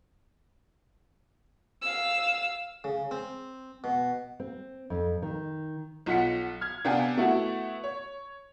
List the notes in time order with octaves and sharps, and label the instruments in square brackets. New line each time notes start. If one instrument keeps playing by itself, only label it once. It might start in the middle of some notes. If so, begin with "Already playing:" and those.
[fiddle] F5 E6
[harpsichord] C#3
C4
B2
[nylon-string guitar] C4
F2
D#3
[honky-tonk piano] B1 F4 F#5 B6 C#7
F6 G#6
C3 B3 D4 F5 G5 G#5
A3 B3 E4 F#4
C#5